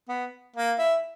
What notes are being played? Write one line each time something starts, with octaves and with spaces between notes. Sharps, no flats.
B3
A#3
E4